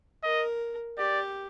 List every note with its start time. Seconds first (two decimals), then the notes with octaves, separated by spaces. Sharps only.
0.24 A#4 D#5
0.98 G4 D5